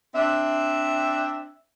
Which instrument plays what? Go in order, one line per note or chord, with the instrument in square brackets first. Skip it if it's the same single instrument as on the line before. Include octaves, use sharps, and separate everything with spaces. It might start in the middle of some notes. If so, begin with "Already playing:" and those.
[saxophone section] C4 D4 E5